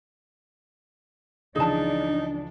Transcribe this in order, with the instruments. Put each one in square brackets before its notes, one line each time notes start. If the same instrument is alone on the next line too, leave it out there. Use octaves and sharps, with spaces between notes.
[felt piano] C#2 E3 F3 [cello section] D4 [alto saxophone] D#4 [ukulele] G#4 A5